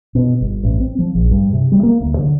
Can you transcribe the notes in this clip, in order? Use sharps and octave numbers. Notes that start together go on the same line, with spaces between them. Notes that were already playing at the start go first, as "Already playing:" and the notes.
B2
G1
A1
C4
F3
A#1
G2
C3
G3
A#3
D2
D3